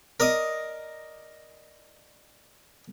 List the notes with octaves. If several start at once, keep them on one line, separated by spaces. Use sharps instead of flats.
A#4 D5 D#5 D#6